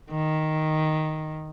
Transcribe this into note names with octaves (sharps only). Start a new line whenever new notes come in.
D#3